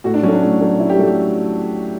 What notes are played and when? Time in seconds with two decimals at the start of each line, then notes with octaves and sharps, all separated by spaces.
0.04 A2 F#4
0.14 D4
0.23 F#3 C#4
0.28 A3 D4
0.42 A2 D4
0.61 F#3 A3
0.80 A2 E4
0.90 G4
0.99 F#3 A3 A4
1.07 G4